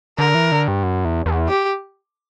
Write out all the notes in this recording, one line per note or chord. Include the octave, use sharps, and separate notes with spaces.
D3 A#4
E3
D3
G2
F#2
E2
E2
G4